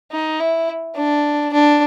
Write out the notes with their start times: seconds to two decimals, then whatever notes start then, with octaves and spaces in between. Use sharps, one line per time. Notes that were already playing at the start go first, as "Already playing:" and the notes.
0.11 D#4
0.40 E4
0.96 D4
1.53 D4